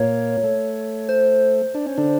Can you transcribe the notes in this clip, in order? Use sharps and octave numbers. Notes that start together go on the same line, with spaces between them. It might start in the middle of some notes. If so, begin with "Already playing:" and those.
Already playing: A#2 A#3 C#5
A3
C5
D4
C#4
D3 D4